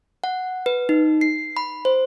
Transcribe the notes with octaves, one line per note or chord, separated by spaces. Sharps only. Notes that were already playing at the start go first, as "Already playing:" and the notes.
F#5
B4
D#4
C7
B5
C5